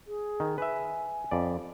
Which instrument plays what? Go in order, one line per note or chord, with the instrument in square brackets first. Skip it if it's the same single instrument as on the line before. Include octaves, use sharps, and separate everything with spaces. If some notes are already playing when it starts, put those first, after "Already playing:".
[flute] G#4
[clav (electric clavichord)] D#3
[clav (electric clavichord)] B4 E5 [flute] G#5
[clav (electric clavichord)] F2 D5